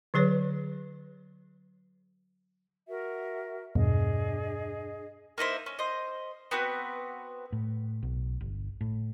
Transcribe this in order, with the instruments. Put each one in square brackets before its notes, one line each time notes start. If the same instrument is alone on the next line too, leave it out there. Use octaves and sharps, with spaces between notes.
[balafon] D3 F#3 G#4 B4 C#5
[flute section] F#4 A#4 E5
[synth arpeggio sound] E2 G2 B2 [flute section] D4 G#4 D#5
[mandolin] A#3 D#4 E4 C5
C#4
C5 D#5
B3 C4 F#4 B4
[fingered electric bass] A2
B1
G1
A2